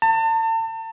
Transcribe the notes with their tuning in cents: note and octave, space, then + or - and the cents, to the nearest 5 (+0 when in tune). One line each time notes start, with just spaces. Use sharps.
A5 +35